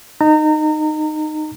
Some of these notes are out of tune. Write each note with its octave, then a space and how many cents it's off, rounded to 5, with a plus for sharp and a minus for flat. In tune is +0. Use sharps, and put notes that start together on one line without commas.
D#4 -15 A#5 -30